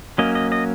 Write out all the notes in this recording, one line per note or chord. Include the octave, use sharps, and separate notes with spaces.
F#3 A#3 C#4 D#5
D#5
D#5